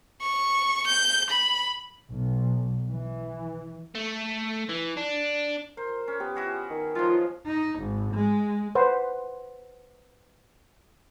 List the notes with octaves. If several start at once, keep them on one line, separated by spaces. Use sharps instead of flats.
C#6
G6
B5
B1
E3
A3
E3
D4
A#4 C5
C#4
B3 G4
E4 F#4 G#4
D#3
F3 F#3 G#3 F4
D#4
G#1
G#3
B4 C5 F#5